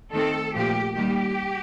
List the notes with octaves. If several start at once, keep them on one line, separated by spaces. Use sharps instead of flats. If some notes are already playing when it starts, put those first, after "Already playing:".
D#3 A3 C4 A4
A#2 F3 A3 G4
D#3 G3 A#3 G4